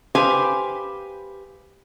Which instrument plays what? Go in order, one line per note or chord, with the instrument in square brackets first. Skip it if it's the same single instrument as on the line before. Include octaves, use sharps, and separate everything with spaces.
[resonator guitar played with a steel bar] G4 B4 C5 F5 G#5